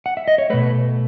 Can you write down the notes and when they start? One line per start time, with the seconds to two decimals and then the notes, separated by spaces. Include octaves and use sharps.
0.06 F#5
0.17 E5
0.28 D#5
0.38 C#5
0.50 B2 A3 B4